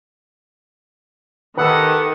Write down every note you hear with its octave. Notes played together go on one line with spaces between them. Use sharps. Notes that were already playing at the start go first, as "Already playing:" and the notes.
D#3 G4 A4 B4 F#5 D#6 E6